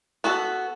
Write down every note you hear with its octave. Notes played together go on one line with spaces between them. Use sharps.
B3 F#4 A4